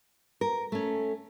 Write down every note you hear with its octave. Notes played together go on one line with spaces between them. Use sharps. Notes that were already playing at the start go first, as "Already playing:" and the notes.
A#4
A3 C#4